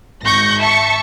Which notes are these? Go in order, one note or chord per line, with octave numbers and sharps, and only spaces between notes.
G#1 C#6 G6 A#6
E5 A5 C#6